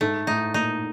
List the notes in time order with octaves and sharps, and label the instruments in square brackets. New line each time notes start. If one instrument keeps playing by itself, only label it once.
[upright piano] G#2 [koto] A3
[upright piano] A2 [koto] D#4
[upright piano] A#2 [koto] D#4